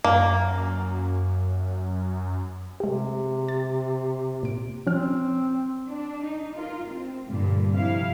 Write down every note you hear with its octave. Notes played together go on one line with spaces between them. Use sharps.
F#2 A#3
C3 G#3 G4
A6
A#2 D7
F3 C4 C#4 F6
D4
D#4
F4 A#4
C4
G2 A#2 D3
F2 C3 E4 F5